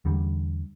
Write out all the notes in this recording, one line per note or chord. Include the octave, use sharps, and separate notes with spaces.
E2 D3 G3